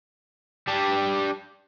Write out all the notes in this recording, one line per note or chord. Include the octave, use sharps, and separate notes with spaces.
G3 D4